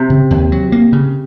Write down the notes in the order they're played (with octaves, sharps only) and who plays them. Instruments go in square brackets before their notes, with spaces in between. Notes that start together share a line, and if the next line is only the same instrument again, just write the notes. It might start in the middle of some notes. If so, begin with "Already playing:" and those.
Already playing: [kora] C3
[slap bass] C#3
D#2
F#3
A#3
C#3